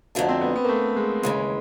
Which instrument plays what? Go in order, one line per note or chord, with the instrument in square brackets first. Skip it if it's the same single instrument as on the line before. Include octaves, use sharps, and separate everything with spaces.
[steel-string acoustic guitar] F2 D3 F#3 A3 D4
[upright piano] C4
B3
B3
A#3
A3
G#3
[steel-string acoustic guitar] D#2 C#3 E3 [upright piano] G#3